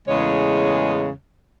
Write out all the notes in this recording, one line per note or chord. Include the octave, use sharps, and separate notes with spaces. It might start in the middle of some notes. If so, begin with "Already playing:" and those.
E2 A2 C#3 G#3 C#5